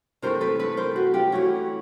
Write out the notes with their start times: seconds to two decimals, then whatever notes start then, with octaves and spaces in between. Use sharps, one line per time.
0.22 C3 E3 A3 A#4 C5
0.41 A4 B4
0.59 A4 B4
0.77 A#4 C5
0.96 F#4
1.14 F4 G4
1.32 E3 A3 C#4 F#4